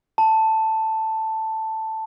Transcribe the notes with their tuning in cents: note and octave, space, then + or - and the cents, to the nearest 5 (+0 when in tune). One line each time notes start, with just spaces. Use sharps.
A5 +5